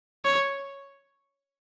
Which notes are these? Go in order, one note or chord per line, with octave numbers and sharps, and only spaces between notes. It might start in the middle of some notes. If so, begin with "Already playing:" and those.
C#5